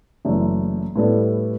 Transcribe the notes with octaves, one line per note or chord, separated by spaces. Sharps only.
F#1 F#2 E3 A3 D4
A2 G3 B3 D4 A4